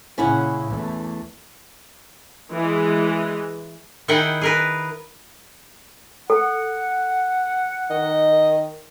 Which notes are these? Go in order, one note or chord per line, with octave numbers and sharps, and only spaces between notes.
A#2 C#3 C#4 E4 F#5
E2 A3
E3 G#3
D#3 E4 G#4 F#5 G5
G#4 A#4 B4
A4 F#5
D#3 D#5